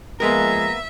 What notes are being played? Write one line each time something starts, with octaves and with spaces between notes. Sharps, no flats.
F3 G#3 A#3 B3 A#4 E5 A#5